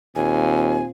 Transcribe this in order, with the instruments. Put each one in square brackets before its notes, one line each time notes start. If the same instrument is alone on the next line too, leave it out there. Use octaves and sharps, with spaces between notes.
[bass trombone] D#2 [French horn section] A#2 C4 F4 [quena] G#5